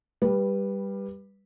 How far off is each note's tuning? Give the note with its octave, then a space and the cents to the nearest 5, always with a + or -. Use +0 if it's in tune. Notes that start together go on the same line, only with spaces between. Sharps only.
G3 +10 B4 -15